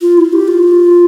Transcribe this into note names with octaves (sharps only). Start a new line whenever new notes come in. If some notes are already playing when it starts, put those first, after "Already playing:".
F4
E4
G4
F4